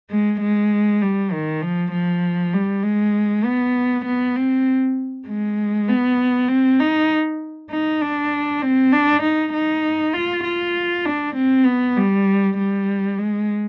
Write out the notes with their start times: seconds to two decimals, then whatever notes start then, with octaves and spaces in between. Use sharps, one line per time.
0.10 G#3
0.41 G#3
1.02 G3
1.32 D#3
1.62 F3
1.92 F3
2.53 G3
2.83 G#3
3.44 B3
4.06 B3
4.36 C4
5.27 G#3
5.88 B3
6.49 C4
6.80 D#4
7.70 D#4
8.01 D4
8.62 C4
8.92 D4
9.23 D#4
9.54 D#4
10.13 F4
10.44 F4
11.05 D4
11.36 C4
11.65 B3
11.97 G3
12.58 G3
13.18 G#3